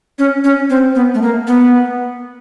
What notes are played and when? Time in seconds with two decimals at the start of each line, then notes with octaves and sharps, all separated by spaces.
0.19 C#4
0.44 C#4
0.70 C4
0.95 B3
1.14 A3
1.22 A#3
1.47 B3